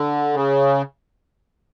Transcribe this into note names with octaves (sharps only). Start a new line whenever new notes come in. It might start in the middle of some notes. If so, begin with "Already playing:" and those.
Already playing: D3
C#3